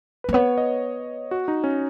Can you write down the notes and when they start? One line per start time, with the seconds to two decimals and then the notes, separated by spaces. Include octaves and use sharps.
0.24 A#3 B4
0.33 B3 C#5
0.58 D#5
1.31 F#4
1.48 D#4
1.64 C#4